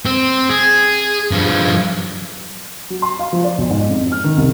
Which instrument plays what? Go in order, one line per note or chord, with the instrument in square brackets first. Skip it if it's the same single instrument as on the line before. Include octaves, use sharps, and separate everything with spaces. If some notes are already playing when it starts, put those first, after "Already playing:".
[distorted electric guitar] C4
G#4
G2 F3
[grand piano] F#3
C6
F5
F3
D5
B1
G#2
F2
F6
D#3
C2